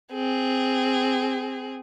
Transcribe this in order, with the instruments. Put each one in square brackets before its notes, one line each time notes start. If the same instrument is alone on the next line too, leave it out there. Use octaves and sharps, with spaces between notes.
[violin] C4 G#4